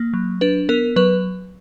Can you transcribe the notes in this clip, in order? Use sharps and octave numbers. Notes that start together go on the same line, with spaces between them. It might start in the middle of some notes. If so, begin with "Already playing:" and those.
Already playing: A#3
F#3
D4 B4
B3 A#4
F#3 B4